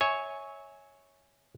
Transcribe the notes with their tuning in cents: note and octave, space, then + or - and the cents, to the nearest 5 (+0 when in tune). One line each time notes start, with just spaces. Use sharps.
C#5 +0 E5 -25 G#5 +0